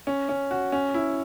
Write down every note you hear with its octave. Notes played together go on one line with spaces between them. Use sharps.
C#4
C#4
F#4
C#4
E4